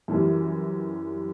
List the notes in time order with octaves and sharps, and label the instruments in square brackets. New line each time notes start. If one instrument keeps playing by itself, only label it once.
[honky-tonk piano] F#2 E3 G3